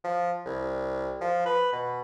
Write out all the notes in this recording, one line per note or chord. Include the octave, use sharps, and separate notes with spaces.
F3
C2
F3
B4
B2